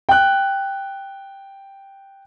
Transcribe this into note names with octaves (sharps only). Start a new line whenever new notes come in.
G5 F#6